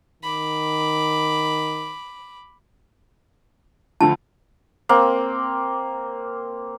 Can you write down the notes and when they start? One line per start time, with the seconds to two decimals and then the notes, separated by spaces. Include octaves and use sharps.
0.23 D#3 B5 D6
4.01 D2 D3 F3 A5
4.89 A#3 C4